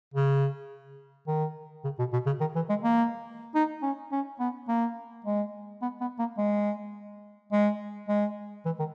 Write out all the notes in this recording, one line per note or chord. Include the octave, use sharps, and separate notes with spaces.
C#3
D#3
C#3
B2
B2
C#3
D#3
E3
G#3
A#3
D#4
C#4
C#4
B3
A#3
G#3
B3
B3
A#3
G#3
G#3
G#3
E3
D#3